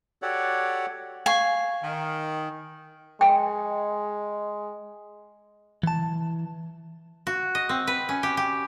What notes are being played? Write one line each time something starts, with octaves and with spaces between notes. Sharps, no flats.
F#4 G4 A4 C#5 D5 F#5
F5 G#5 C#6 C7
D#3
G#3 G5
E3 A5
F#4
D#5
C4
B4
C#4
G4
G4